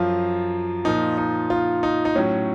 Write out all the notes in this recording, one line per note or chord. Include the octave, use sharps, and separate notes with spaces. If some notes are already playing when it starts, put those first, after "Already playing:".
Already playing: F#2 F3 F4
A#2 F3 D#4
D#4
F4
D#4
D#4
A2 F#3 C#4